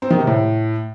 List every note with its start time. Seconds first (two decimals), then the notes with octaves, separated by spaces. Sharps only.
0.02 C4
0.10 D#3
0.19 C3
0.27 A2